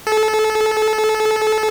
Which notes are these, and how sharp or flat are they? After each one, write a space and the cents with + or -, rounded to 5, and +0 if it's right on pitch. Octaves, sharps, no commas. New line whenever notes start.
A4 -25